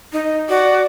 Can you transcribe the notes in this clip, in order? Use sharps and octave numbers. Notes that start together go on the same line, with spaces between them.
D#4
F#4 D5